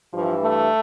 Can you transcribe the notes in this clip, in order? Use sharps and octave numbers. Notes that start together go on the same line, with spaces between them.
G2 E3 F3
A3